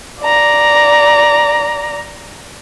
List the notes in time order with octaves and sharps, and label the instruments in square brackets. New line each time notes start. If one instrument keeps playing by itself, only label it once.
[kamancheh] D5 A#5